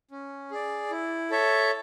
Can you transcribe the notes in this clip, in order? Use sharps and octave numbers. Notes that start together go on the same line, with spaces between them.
C#4
G#4 D5
E4
A4 C#5 E5